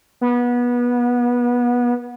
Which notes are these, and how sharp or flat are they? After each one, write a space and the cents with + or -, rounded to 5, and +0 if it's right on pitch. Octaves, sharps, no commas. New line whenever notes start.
B3 -25